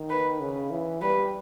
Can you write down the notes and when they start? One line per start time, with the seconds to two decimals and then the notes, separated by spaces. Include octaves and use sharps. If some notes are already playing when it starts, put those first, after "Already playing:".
Already playing: D#3
0.10 B4
0.40 C#3
0.71 E3
1.01 G3 B4